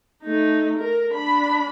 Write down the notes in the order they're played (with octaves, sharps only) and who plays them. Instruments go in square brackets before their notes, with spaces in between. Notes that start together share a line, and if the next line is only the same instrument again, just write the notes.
[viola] A3 D#4
A#4
D4 B5